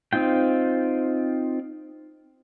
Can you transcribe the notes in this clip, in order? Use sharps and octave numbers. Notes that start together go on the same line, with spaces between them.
C4 D#4 F4 G5